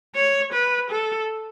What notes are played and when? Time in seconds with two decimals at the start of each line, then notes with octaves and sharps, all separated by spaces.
0.15 C#5
0.53 B4
0.90 A4